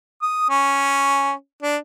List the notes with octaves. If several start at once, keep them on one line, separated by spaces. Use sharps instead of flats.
D#6
C#4
D4